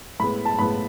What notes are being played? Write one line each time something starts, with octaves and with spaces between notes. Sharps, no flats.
A2 G#3 B3 B5
A5
A2 G#3 B3 B5